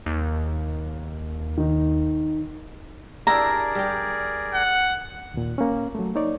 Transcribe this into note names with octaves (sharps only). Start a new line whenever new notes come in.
D#2
D#3 D#4
D4 E4 G4 G#4 A#4 D5 A#5
G3 G4
F#5
D#2 A#2
A#3 C#4
F#3 A3
A#3 D#4 C#5 D5